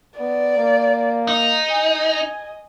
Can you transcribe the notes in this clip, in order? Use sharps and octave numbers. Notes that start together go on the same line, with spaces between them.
B3 D5
A#3
D#4 D#5
G#5